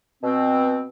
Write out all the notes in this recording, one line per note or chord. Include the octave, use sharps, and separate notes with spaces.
B2 C4